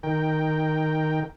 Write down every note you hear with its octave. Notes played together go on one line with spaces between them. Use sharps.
D#3 A#4 G5